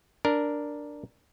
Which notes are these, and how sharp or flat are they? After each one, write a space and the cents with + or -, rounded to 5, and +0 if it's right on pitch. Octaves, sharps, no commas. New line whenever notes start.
D4 +0 A#4 +0